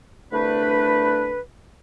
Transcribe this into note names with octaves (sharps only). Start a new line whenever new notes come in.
C2 D3 A3 D4 B4